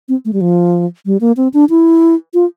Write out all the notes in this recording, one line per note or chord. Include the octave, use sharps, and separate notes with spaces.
C4
A3
G3
F3
G3
A#3
C4
D4
E4
F4